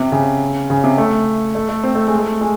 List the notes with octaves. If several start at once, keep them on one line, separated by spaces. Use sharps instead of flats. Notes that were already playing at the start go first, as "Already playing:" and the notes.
Already playing: C3
C#3
C#3
C3
A3
A3
A3
C4
A3
G#3
A3
G#3